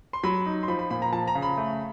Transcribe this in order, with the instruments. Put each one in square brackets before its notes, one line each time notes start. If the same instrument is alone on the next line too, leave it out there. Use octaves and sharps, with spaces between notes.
[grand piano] C6
F#3 B5
D#4
C6
F3 B5
B5
A#2 B5
A#5
F3 A5
A#5
C#3
B5
A3